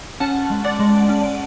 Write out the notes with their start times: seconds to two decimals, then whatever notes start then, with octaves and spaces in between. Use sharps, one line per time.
0.20 C#4 F#5 A5
0.50 G#3
0.64 D5 F#5
0.79 G#3
1.09 C#4